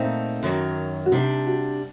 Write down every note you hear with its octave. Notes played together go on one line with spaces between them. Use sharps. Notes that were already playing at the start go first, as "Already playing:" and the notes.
Already playing: A#2 A3 C4 D#4 A4
F#2 D#3 F#3
F#4
C3 G3 D4 D#4
F#4